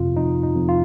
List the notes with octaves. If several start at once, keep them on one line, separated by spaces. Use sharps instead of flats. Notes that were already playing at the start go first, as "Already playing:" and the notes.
Already playing: F2 C3 F4
F2 D#4
D#4
F2
F4